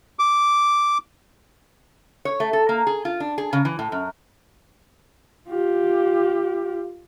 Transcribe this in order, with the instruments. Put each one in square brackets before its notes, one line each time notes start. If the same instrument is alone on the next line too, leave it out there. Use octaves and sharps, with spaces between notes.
[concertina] D6
[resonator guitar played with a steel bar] C#5
A3
A4
A#3
G#4
F4
D4
G#4
C#3
E3
A2
F#2
[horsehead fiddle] F4 G4